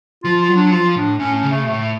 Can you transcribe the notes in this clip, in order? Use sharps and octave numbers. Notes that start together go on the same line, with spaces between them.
F3 F4
F4
F#3
D4
F3 F4
A2 D4
A2 C#4
C#4
C#3
A3
B2
A2 A3